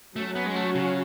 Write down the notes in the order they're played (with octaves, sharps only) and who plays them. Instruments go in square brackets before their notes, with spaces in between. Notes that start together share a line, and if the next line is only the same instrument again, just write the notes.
[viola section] F#3 C#4 F#4 [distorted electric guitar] A3
[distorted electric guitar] B3
G#3
A3
C#3